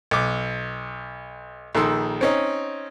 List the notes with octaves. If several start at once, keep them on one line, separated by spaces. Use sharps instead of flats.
B1 D6
A#1 D#3 A4 C6 E6
C4 C#4 D#4